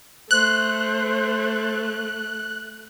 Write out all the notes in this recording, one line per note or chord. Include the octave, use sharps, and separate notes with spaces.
A3 C5 F#6